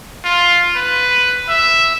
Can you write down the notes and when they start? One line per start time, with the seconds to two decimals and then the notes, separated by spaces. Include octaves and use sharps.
0.24 F4
0.76 B4
1.48 E5